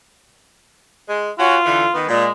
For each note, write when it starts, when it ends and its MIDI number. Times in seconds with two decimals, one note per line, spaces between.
1.08 1.30 56
1.39 1.55 61
1.39 1.94 65
1.39 1.55 66
1.65 1.84 50
1.65 1.84 52
1.94 2.08 51
1.94 2.08 59
2.09 2.25 46
2.09 2.32 56